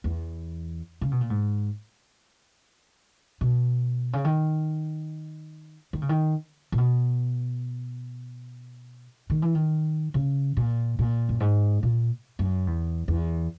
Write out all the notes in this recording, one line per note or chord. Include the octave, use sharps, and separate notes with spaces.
E2
C#3
B2
A#2
G#2
B2
C#3
D#3
D#3
C#3
D#3
A#2
B2
D#3
E3
D#3
C#3
A#2
A#2
F#2
G#2
A#2
F#2
E2
E2